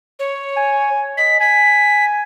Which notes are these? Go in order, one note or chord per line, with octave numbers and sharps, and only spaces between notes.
C#5
G#5
D#5 B6
G#5 B6